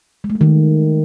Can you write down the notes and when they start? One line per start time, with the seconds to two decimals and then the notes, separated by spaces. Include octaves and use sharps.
0.24 G#3
0.30 A3
0.35 G#3
0.41 D#3